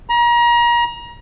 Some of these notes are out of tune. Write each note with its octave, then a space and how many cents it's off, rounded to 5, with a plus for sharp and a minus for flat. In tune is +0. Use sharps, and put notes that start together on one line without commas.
A#5 +35